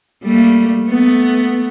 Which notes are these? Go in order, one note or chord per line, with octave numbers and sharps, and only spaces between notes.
G3 A3 A#3
A3 B3